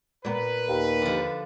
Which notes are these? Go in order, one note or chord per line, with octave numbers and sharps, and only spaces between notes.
A#2 B3 B4
D#2
D3 F3